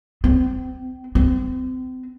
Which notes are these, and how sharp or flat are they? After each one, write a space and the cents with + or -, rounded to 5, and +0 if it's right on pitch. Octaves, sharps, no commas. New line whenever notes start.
C4 -30
C4 -35